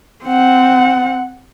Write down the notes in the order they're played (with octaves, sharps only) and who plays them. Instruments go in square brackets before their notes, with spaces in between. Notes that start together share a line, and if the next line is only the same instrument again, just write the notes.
[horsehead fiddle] C4 F#5